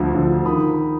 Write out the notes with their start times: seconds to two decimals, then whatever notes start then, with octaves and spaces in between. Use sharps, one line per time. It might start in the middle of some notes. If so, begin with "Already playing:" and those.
Already playing: D2 D3 F3
0.13 D2 D3 F3
0.45 D#3 B5 D#6